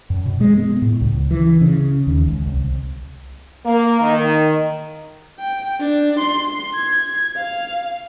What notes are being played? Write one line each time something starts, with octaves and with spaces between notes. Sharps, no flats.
F#2
B2
G#3
B3
A2
C#2
E3
C#3
D#2
C#2
C2
A#3
D#3
G5
D4
C6
G#6
F5